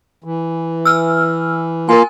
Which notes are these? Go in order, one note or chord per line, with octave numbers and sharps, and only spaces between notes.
E3
E6 F6
A#3 F4 A#4 G#5